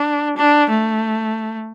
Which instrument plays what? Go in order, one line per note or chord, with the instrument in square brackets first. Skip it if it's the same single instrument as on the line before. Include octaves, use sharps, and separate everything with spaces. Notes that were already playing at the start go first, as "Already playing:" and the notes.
Already playing: [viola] D4
D4
A3